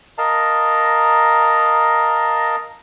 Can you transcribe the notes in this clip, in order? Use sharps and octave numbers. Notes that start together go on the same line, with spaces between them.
A#4 D#5 F5 A5 A#5